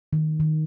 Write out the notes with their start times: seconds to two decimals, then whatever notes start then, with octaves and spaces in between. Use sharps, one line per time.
0.13 D#3
0.40 D#3